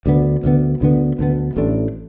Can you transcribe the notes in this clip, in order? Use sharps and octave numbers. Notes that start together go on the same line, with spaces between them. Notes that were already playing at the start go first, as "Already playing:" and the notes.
D2 D3 B3
D2 D3 B3
D2 D3 B3
D2 D3 B3
A1 A2 A3 D4